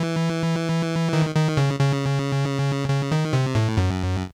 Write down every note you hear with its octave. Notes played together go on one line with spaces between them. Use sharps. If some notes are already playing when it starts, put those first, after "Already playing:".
Already playing: E3
D#3
D#3
C#3
C#3
C#3
D#3
C3
A2
F#2